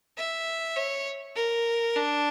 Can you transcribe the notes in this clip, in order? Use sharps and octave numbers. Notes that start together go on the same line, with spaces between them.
E5
C#5
A#4
D4